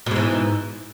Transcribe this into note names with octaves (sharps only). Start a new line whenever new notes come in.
G#2 B2 E3